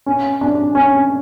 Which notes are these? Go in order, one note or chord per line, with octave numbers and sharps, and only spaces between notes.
C#4
D4
C#4